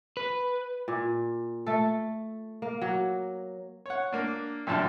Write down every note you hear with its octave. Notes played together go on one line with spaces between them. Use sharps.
B4
A#2
A3 A4
A#3
F#3
C#5 F#5
A#3 D4
C2 F#2 A#2 D3 A5